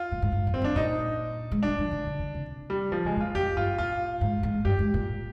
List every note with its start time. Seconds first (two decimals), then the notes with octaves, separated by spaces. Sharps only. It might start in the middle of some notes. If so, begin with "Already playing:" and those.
Already playing: F4
0.12 A#2
0.22 G#2
0.32 G2
0.47 F2
0.54 C4
0.62 G2 D4
0.76 A#2 D#4
1.52 G#3
1.63 G3 D4
1.79 F3
1.91 D#3
2.06 D3
2.20 D3
2.34 C3
2.70 G3
2.91 A#2 F3
3.04 C3 G#3
3.17 A#2 F4
3.35 F2 G4
3.56 G2 F4
3.78 A#2 F4
4.21 G#2
4.43 G#2
4.65 G2 G4
4.79 G#2
4.94 A#2